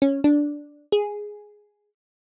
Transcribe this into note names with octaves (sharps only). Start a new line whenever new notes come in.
C#4
D4
G#4